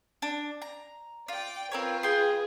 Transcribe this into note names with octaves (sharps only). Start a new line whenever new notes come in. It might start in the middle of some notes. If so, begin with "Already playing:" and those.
D4
A#5
F4 D5 G5
C4 F4 A#4 B4 C#5
G#4 G5 C6